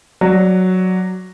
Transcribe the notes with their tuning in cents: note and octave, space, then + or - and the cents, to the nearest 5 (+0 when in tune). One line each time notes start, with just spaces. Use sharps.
F#3 +0 D5 +0